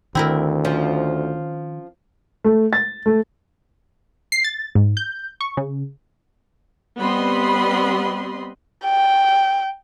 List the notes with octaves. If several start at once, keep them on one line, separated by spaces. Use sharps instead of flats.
D2 D#3 C4 E4 A#4
F3 C#4
A3
A6
A3
C7
A6
G#2
G6
C#6
C#3
G3 B3 C4 D#5 B5 C6
G5